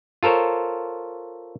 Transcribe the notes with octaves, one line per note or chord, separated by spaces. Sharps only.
F4 A4 A#4 C5 C#5